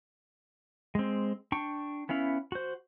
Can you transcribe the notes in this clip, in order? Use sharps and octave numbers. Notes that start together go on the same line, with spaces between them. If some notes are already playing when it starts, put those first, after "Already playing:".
G#3 C4
D4 G5 C#6
B3 C#4 E4 F5
F#4 C5